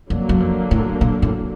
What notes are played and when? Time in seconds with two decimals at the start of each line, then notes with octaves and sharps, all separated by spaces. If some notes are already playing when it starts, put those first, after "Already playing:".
0.10 F2 D3 F#3 A#3
0.29 F#2
0.40 F2
0.71 A2
1.01 A#2
1.22 A2